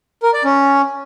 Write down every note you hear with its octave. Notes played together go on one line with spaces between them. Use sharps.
A#4
D5
C#4